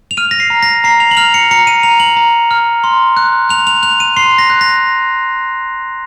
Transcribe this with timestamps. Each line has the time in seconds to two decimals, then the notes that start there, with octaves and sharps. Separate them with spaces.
0.11 F7
0.17 F6 D#7
0.31 A#6
0.40 C7
0.50 A#5
0.63 A#6
0.84 A#5 C7
1.00 F7
1.11 F#7
1.17 F6 F7
1.34 C#7
1.51 A#5 C#7
1.67 D#7
1.83 A#5 F7
2.00 F#7
2.17 A#5
2.51 F6
2.84 C6
3.17 F#6
3.49 F#6 F7
3.67 F7
3.82 F#6 F7
4.00 D#7
4.17 C6 C7
4.38 A#6
4.50 F#6
4.61 A#6